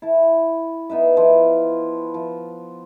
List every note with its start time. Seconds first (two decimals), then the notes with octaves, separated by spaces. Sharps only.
0.02 E4 A5
0.90 B3 D#4 B4 E5
1.17 F3 E4
2.14 F3